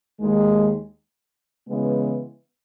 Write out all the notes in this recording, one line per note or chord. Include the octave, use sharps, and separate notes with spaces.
D#2 D#3 G#3
C#3 E3 G#3 B3